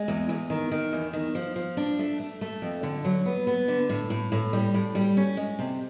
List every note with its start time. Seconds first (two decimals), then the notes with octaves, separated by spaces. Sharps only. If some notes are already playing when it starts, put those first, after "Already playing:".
Already playing: G#3
0.08 E2
0.29 E2
0.50 D#3
0.71 D#3
0.93 E2
1.13 D#3
1.35 F3
1.56 F3
1.77 D4
1.99 A3
2.20 A3
2.41 A3
2.62 F2
2.83 D3
3.05 F#3
3.26 B3
3.47 B3
3.68 D3
3.89 A2
4.10 A2
4.32 A2
4.53 G3
4.74 A2
4.95 G3
5.17 C#4
5.37 G#3
5.59 C3